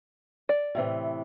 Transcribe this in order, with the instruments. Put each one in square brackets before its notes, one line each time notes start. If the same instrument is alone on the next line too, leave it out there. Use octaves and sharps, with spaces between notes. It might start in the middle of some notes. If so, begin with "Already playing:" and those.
[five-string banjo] D5
[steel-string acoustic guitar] A2 C3 E3